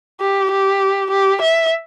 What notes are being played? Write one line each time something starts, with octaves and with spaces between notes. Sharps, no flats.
G4
G4
G4
E5